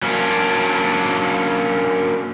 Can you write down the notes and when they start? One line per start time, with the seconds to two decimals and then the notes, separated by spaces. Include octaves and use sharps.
0.02 F#3 A#3 C#4 D4